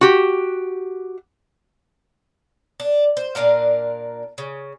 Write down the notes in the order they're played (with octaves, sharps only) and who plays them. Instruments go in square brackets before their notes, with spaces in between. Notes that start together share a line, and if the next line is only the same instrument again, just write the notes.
[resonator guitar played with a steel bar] F#4 G4
[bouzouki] D4
C5
A#2 D4 A#4 F5
C#3